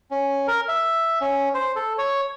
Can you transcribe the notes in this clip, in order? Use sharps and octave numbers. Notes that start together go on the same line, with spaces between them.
C#4
A#4
E5
C#4
C5
A4
C#5